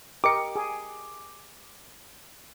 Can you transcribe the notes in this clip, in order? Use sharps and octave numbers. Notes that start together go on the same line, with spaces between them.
G4 A#4 D#5 D6 C#7
G#4